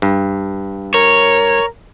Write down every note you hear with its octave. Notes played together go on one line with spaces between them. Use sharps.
G2
A#4 C#5